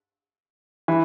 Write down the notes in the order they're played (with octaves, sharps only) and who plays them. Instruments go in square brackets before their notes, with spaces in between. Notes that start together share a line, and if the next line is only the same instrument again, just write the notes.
[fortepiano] E3